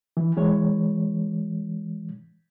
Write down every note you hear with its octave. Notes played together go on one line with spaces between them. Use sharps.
E3
E3 G#3 C#5